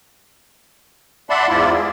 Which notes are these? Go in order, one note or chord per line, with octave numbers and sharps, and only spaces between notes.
D5 E5 F#5 A5 B5 C6
E2 G#2 E4 F4 D5
G#4